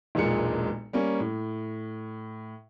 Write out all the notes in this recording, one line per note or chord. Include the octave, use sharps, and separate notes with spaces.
E1 B1 A#2 G#3 C#7
G3 A#3 C#4
A2